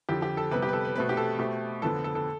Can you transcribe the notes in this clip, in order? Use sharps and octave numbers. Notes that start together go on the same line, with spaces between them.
F2 D3 F3 G4
G4
A4
C3 G3 B3 B4
G4
B4
A4
B4
B2 A3 C4 B4
G4
A4
B2 A3 C4 G4
F2 D3 F3 B3 A4
A4
A4